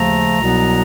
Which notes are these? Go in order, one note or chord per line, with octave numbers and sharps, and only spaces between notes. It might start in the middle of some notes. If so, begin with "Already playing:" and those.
Already playing: D#2 C#3 F3 A3 A#5
C2 B2 F#3 B3